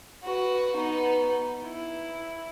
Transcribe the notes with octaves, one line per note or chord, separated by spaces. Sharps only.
F#4 B4
B3 D#4
E4